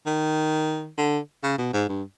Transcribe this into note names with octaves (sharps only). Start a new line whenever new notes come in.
D#3
D3
C#3
B2
G#2
G2